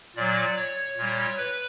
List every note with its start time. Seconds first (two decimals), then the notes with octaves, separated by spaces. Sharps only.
0.16 A#2 F#3 D5
0.57 C#5
0.98 A#2 G3
1.38 B4